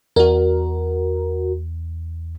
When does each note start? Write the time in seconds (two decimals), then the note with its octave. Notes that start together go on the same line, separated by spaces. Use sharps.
0.16 E2 F#4 A#4